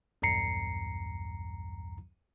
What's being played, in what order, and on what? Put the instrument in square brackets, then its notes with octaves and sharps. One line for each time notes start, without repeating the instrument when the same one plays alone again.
[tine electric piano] B1 E2 G2 A#5 C7 C#7